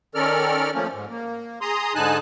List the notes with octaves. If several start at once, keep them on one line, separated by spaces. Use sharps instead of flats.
D#3 C#4 A4 A#4 D5 F6
F3 A3 A#3 C#4
G#2
A#3
G#4 A#5 C6 D#6
G#2 D3 D#4 G#5 A5 F#6